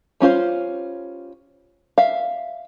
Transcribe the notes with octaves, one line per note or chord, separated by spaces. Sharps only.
G3 C#4 F4 C5
E5 F5